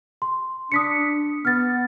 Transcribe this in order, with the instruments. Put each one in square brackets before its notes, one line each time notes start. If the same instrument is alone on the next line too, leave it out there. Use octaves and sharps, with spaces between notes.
[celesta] C6
[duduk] D4 [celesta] D#6 B6 C#7
[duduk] B3 [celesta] F6 A6